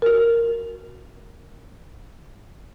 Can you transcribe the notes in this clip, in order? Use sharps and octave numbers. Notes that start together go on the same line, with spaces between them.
F#4 A#4